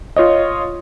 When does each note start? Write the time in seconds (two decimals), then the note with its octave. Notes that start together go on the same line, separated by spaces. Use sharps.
0.16 F4 C#5 D#5